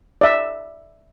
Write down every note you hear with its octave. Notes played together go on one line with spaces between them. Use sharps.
D5 E5